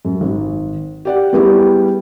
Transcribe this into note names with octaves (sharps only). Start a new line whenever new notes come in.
F#2
G#1
G4 D5 F#5
G3 B3 E4 G4 G#4